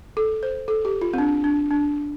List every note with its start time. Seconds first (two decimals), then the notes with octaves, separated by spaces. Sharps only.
0.17 A4
0.43 C5
0.68 A4
0.85 G4
1.01 F4
1.14 C4
1.18 D4
1.44 D4
1.71 D4